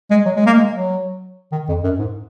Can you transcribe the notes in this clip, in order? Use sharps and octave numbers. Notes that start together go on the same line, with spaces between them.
G#3
F#3
G#3
A#3
G#3
F#3
D#3
F2
F#2
G#2